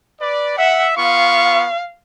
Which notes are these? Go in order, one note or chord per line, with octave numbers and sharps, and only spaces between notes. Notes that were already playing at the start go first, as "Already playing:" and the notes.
B4 D5
E5 F#5
B3 F4 F5 C#6